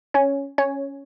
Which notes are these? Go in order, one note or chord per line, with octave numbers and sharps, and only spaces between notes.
C#4 C#5
C#4 C#5